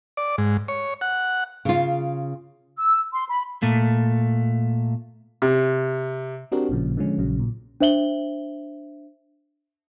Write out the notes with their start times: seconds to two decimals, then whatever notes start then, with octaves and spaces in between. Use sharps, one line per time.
0.17 D5
0.38 G#2
0.68 C#5
1.01 F#5
1.65 C#3 F4
2.77 E6
3.13 C6
3.29 B5
3.62 A#2 A3
5.42 C3
6.52 C4 D4 F#4 G4 A#4
6.69 A1 A#2 C#3 F3
6.97 D3 F3 G#3 C#4
7.18 A#1 C#3 F#3
7.40 A#2
7.81 D4 C5 E5 F#7 G7